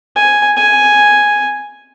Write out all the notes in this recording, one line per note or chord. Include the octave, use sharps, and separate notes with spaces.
G#5
G#5